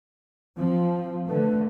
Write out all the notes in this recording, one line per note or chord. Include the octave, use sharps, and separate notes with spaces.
F3 C4
D3 A3 B4